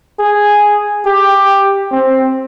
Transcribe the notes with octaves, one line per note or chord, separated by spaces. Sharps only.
G#4
G4
C4